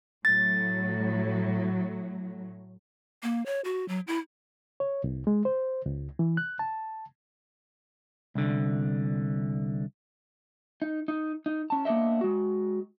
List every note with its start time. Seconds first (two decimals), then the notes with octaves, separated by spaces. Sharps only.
0.25 A2 F#3 A6
3.23 A#3
3.46 C#5
3.64 F#4
3.88 F#3
4.07 E4
4.80 C#5
5.04 C2
5.27 G#3
5.45 C5
5.86 C#2
6.19 E3
6.37 F#6
6.59 A5
8.35 C2 D3
10.82 D#4
11.08 D#4
11.46 D#4
11.70 C#4 A5
11.85 A#3 B3 D4 D#5 E5
12.21 G#3 F#4